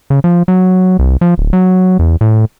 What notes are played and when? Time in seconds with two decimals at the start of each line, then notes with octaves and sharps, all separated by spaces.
0.10 C#3
0.24 F3
0.48 F#3
0.99 C2
1.21 F3
1.38 D1
1.53 F#3
1.99 E2
2.21 A2